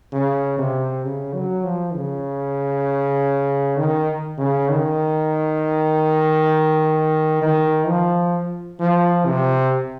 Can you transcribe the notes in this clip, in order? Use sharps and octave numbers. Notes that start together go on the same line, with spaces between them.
C#3
C3
C#3
F#3
F3
C#3
D#3
C#3
D#3
D#3
F3
F3
C3